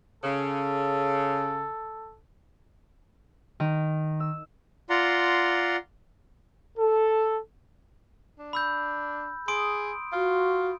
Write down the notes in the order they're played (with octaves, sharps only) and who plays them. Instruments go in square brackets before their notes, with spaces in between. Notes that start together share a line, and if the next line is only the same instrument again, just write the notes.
[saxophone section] C#3 [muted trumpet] A4
[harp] D#3
E6
[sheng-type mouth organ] F4 D5 F#5 A#5 C6
[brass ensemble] A4
[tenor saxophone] D4
[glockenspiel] B5 E6 G6
[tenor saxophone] G#4 [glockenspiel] C6 D#6 D7
[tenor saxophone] F4 [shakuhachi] F#4